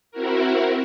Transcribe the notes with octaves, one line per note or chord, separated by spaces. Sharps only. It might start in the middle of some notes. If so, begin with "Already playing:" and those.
C4 E4 F#4 A#4